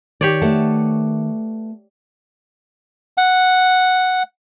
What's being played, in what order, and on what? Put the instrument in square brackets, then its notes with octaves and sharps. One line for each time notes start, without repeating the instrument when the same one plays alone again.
[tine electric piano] D#3 [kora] G4 C#5 D5
[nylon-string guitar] A3 B3 A4
[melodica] F#5